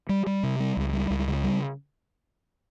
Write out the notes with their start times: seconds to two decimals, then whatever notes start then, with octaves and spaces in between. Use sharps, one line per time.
0.09 G3
0.27 G3
0.43 C3
0.60 G3
0.77 C#2
0.93 G3
1.10 C#2
1.28 C#3
1.44 G3